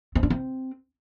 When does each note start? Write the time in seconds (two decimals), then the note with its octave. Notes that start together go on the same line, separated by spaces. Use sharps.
0.15 C4
0.23 D4
0.30 C4